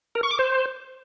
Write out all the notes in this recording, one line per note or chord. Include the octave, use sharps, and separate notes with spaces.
A#4
C#6
D6
C5